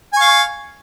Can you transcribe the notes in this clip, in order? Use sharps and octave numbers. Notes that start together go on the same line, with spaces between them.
F5 G#5 C#6